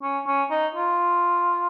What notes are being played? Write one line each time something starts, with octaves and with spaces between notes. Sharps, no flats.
C#4
C#4
D#4
F4